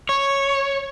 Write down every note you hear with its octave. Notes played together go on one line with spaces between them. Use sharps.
C#5